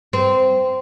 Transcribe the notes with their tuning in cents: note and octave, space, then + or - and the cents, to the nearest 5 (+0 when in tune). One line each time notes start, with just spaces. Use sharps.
C4 -15